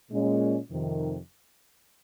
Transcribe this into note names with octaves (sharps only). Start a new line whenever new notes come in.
A#2 G#3 C#4
F2 C3 D#3